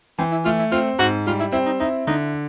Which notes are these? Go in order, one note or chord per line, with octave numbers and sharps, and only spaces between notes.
E3 C4
E4
A3 F4
E4
C4 F4
G#2 F#4
G3 F4
E4
C4 E4
D#4
D#4 E4
D3 D#4